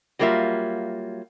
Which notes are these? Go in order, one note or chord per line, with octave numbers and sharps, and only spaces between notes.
F#3 G3 A#3 F4 E5